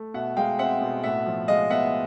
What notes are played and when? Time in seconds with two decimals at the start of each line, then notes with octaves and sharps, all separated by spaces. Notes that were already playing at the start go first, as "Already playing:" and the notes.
Already playing: A3
0.14 B2 E5 F#5
0.37 G#3 F5 G5
0.59 C4 E5 F#5
0.81 B2
1.03 A2 E5 F#5
1.26 F3
1.48 G#3 D#5 F5
1.70 B3 E5 F#5